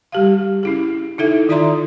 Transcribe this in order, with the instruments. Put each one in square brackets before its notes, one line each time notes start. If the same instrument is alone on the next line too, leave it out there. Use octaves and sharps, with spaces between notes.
[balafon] G3 G4 F5
C#4 E4 G#4
D#4 E4 A4 E5
D#3 F4 D5 E5 A#5 C6